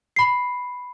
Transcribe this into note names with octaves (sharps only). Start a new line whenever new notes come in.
B5 C7